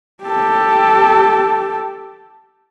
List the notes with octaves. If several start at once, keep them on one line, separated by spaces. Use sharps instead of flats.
G4 A4